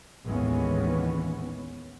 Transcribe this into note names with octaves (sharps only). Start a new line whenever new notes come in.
A1 D#2 E3 G#3 B3 C#4